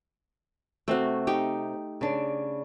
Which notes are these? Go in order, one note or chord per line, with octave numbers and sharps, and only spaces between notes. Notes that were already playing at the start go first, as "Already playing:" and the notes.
C3 A3 C4 F#4
D#4 G4
C#3 D4